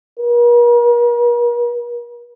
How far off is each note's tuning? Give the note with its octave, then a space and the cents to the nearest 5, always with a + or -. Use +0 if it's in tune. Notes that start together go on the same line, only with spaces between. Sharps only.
A#4 +45